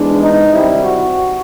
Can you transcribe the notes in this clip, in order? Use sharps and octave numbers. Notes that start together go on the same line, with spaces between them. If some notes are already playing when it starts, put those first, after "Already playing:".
Already playing: G#2 E3 G#3 B3 D4
D#4
C2 C3 D#3 G3 C4 E4
F#4